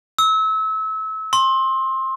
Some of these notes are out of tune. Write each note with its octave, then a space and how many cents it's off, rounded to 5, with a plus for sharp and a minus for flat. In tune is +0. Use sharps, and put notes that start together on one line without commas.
E6 -30
C6 +20